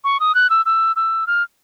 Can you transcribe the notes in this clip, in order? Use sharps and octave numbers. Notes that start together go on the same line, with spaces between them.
C#6
D#6
F#6
E6
E6
E6
F6